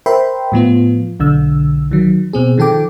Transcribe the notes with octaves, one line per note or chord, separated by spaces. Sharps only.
A#4 C5 E5 G5 B5 C6
A2 F3 B3 F4
B1 D3 E6
D#3 F#3
B2 C4 G#4
D#3 F3 A4 G5 D6